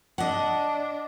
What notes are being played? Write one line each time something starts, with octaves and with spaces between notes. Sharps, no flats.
D4 D#5 F#5